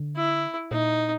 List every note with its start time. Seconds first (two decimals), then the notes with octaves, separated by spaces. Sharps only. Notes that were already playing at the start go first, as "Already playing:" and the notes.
Already playing: D3
0.17 E4
0.71 A#2 D#4